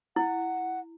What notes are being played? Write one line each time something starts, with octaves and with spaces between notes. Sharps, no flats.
E4 F#5